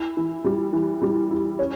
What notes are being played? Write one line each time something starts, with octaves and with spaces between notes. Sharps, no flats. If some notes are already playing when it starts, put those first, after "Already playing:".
Already playing: E4
E3
G3
E3
G3
E4
C#4